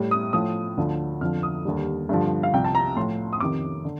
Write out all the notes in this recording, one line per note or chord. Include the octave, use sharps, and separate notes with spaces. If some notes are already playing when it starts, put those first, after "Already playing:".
Already playing: A2 G3
D#6
A2 F3 D#6
D2 D3 F3
F2 D3 F3 F6
D#6
D#2 D3 G3
G2 D3 F3
F5
C2 C3 F3 G5
A5
A#5
A2 F3 C6
D#6
F2 C3 D#3 D6
D3